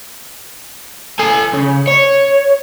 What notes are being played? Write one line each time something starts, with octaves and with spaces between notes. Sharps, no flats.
A4 G#5
C#3
C#5